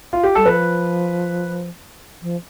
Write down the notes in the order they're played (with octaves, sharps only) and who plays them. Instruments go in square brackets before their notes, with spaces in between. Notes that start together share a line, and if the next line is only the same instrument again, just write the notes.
[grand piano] F4
G4
[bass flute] G3 [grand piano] A4
[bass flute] F3 [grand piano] B4
[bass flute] F3